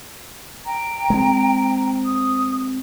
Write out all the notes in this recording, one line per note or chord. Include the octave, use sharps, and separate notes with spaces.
G5 A#5
G#3 C4
D#6